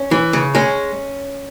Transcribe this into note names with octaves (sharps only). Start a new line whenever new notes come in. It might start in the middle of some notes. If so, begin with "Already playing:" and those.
Already playing: C#4
E3
C#3
G#3 C#4